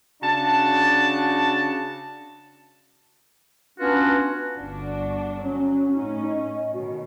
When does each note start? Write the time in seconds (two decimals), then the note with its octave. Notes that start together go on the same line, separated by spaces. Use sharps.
0.23 C#3 D4 F#4 A5
3.79 B3 C#4 D4 F4 F#4 B4
4.56 G1 D4 F#4
5.44 F#3 C#4
5.95 A2 C#4 D#4
6.26 D#5
6.74 B2 D#3 F#4